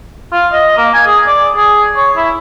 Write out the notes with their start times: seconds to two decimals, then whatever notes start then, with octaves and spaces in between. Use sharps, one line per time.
0.32 F4
0.52 D#5
0.77 A#3
0.94 G#5
1.06 G#4
1.26 D5
1.55 G#4
1.96 C#5
2.17 E4